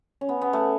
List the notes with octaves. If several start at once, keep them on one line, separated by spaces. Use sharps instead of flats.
C#4
B3
B3
A3